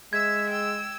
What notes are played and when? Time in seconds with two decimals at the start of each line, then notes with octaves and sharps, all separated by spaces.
0.13 G#3 E5 E6 G#6
0.49 G5 E6